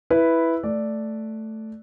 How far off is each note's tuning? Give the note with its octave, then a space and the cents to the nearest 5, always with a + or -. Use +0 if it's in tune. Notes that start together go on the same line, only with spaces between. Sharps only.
E4 +0 B4 +0
A3 +0 D5 +0